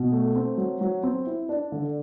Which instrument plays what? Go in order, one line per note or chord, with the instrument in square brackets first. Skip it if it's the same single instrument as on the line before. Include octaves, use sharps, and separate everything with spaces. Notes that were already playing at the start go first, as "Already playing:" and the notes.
Already playing: [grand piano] B2
A3
C4
F#3
F#3
C4
E4
D4
D3